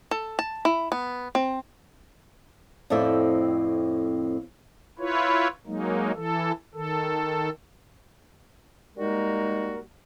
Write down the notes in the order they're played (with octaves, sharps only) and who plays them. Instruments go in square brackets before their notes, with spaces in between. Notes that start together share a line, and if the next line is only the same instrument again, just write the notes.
[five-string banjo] A4
A5
E4
B3
C4
[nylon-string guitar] F2 A2 C4 A4 D5 E5
[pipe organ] E4 F4 B4 C#5
F#3 G#3 A#3 D#4
E3 A4
D#3 A4
[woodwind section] G3 G#3 A#3 D#4 F#4 A#4